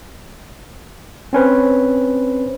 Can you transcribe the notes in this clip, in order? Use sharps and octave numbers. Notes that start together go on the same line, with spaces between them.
C4 C#4 B4 C5